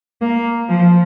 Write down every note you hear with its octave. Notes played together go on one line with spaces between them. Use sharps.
A#3
F3